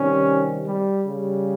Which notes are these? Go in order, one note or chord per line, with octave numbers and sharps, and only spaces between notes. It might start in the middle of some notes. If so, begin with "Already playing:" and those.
Already playing: C3 D#3 G3 C#4
G3
C#3 G3